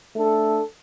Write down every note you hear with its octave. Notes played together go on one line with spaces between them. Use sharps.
A3 D4 A4